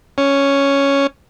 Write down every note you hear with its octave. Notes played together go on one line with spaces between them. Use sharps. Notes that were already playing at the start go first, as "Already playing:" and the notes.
C#4